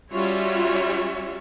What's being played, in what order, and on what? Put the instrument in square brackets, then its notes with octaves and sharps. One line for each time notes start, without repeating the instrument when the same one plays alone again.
[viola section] G3 C#4 F4 F#4 C#5 E5